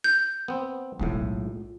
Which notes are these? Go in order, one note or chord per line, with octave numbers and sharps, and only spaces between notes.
G6
B3 C4
B1 A2 G#3 F4